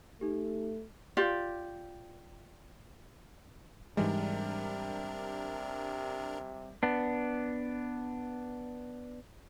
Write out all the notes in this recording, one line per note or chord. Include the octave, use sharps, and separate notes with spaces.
A3 D#4 G4
F4 G4 D5
G#2 C3 E3 G3 G#3 D4 A#4
B3 D4